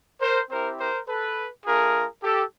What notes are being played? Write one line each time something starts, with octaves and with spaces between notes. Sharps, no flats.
A#4 C5
C4 E4 G4 A#4 C5
A#4 C5
A4 B4
A3 D4 F4 G#4 A#4
G4 A4